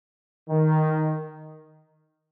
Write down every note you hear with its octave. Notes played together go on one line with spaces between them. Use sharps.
D#3